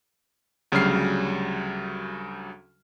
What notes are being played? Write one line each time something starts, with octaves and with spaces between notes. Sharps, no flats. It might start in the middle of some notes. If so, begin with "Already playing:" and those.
D2 C#3 F#3 G3 F6 C7